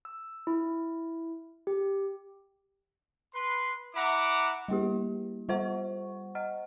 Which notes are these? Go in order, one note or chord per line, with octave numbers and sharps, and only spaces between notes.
E6
E4
G4
B4 C6
E4 E5 F#5 A#5 D6
G3 A#3 E4 G4
G3 F4 C5 F#5 C#6
D#5 F#5 F6